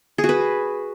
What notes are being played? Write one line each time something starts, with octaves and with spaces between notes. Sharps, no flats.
G#4
F#4
B4